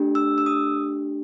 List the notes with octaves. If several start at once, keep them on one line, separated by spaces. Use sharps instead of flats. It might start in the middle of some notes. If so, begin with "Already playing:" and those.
Already playing: A3 D4 G4
E6
E6
D#6